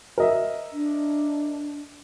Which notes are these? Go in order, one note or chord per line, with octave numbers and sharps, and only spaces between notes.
A#4 D#5 E5
D4